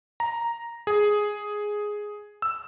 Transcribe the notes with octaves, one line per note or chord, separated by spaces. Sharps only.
A#5
G#4
E6